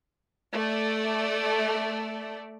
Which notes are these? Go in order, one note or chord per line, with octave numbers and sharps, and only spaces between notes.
A3 D5